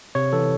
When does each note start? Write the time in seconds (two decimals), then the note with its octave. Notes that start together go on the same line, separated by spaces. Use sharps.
0.15 C3 C#5
0.33 E3 A4